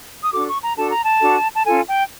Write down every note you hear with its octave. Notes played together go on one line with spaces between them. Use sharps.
D#6
D4 F#4 A4 D6
C#6
A#5
D4 F#4 A4 A5
A#5
A5
D4 F#4 A4
A5
C#4 F4 A4 G#5
G5